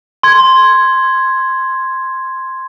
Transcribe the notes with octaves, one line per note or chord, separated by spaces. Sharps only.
C6 G#6